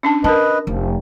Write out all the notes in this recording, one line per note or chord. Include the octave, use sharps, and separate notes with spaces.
C#4 D4 A5
D4 A#4 B4 D#5 A5
F1 F3